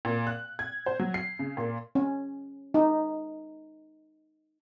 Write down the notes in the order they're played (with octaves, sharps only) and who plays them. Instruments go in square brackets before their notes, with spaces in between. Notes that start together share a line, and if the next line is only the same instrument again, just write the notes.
[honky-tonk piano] A#2
F#6
G#6
C5
F#3
C7
C#3
A#2
[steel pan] C#4
D#4